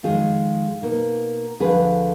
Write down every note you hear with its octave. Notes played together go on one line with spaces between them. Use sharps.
F2 D#3 G#3 F4 G#4
B2 A#3 D#4
D2 D3 F3 G#4 B4